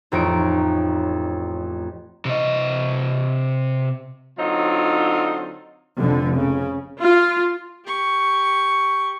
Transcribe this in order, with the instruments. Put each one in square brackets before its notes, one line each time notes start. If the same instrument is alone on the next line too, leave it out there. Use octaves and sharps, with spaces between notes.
[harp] A1 F2 D#4 C#5 D7
[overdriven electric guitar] C3 D#5
[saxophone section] D3 F#3 C4 D#4 F4
[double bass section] F1 F2 D3
C#3
[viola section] F4
[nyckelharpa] G4 C#6